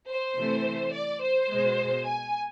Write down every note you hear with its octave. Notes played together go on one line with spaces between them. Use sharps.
C5
C3 E3 A3
D5
C5
B2 G#3
G#5